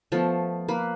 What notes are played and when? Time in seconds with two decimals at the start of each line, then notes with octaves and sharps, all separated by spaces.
0.12 F3 A3 B3
0.68 A#3 B4